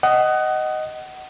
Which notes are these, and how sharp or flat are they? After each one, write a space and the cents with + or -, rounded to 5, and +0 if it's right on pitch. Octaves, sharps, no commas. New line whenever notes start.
D#5 +0 F#5 +25